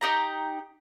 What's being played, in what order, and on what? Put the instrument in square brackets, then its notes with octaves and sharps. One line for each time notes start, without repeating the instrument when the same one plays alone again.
[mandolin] D#4 G4 A#5